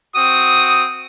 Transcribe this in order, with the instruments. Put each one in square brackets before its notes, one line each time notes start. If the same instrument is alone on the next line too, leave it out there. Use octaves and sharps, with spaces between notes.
[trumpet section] C4 F#4 D#6